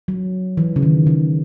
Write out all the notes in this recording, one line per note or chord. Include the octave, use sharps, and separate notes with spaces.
F#3
E3
C#3
D#3
C#3